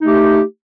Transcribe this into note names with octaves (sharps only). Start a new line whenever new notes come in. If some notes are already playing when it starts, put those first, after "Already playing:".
A3 D#4 G4